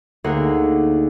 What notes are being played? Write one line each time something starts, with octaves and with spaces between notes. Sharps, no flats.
D2 A#3 D#4 G#4 A#4 F#5